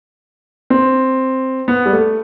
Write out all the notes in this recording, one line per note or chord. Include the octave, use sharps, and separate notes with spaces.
C4
B3
G3
A3